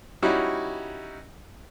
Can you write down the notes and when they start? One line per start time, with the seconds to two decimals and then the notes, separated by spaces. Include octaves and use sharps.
0.22 G3 C#4 D#4 E4 F#4